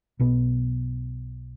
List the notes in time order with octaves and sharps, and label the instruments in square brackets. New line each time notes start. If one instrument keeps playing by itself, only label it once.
[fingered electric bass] B1 B2 B3